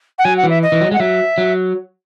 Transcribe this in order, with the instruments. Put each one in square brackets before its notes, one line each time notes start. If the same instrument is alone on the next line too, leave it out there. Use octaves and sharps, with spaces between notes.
[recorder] F#5
[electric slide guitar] F#3 [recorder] G#5
[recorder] F#5
[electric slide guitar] E3
[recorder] E5
D#5
[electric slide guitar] E3
F#3
[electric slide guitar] G#3 [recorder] F#5
[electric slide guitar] F#3 [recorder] E5
[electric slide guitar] F#3